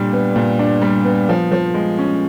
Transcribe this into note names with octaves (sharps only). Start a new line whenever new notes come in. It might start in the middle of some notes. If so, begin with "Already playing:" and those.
Already playing: A#2 G3 D4
B3
A#2
D4
G3
B3
F3
F3
G#3
C#4